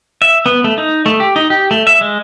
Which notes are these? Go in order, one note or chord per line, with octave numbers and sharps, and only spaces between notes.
E5
B3
A3
D#4
A3
G4
D#4
G4
A3
E5
G#3